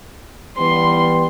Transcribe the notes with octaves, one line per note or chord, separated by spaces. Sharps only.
E3 G3 B3 C6